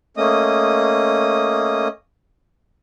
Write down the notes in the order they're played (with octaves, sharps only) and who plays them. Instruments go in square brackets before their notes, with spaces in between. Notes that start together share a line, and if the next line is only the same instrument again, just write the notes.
[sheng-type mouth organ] A3 A#3 C#4 D#5 D#6